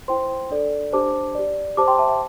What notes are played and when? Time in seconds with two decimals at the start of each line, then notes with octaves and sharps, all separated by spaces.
0.08 E4 C5 G5 C6
0.50 D4 A4 D5
0.93 D4 G4 C5 A5 D6
1.35 G4 D5
1.77 G4 C5 A5 D6
1.88 G5 C6
1.98 E5 A5
2.09 E5